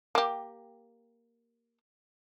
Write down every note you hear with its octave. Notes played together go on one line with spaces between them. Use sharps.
A#3 G4